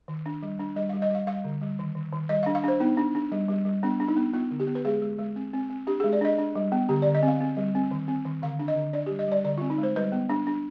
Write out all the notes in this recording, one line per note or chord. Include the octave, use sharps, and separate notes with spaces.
D#3
D4
G3
D4
G3 D#5
F5
G3
D#5
G3 F5
G3 F5
D3
G3
D#3
D#3
D#3
G3 D#5
F5
D4
F5
D4 C5
B3 D#4
D4
D4
G3
G3
G3
B3 D4
D4
D#4
B3
B3 F4
D3
G4
B3
B4
G#3 G#4
G#3
G#3
C4
C4
C4
D4 G4
G#4
G#3
D5
D4 D#5
D4
G3
B3
D3 G4
D5
D3
D#5
C4 F5
C4
G3
C4
D#3
C4
D#3
D3 F5
D4
D#5
D3
D4 D5
G4
G3
D#5
G3 D5
D3 D5
F4
C4
D#4
G#3
C5
G3 B4
B3
D4
D4